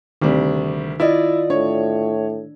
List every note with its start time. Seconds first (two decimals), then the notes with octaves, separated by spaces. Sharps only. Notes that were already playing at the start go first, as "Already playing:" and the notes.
0.22 D2 C3 D#3 G3
1.00 E4 F4 D5 D#5
1.50 A2 D4 C#5